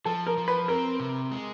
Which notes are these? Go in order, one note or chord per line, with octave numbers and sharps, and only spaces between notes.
F3 A4
A#4
F3
B4
C4 A#4
C3
G#3